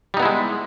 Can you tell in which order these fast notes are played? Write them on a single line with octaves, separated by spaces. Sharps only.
G3 D#4 B3 E4 G#3